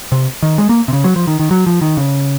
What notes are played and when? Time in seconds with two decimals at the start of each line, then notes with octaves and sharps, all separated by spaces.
0.12 C3
0.42 D#3
0.58 G#3
0.69 A#3
0.88 C3
0.93 C#3
1.04 F#3
1.16 F3
1.27 D#3
1.40 D#3
1.51 F#3
1.66 F3
1.82 D#3
1.97 C#3